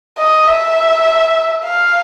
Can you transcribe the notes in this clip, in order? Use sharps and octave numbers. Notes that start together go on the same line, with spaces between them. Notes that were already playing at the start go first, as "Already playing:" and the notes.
D#5
E5
F5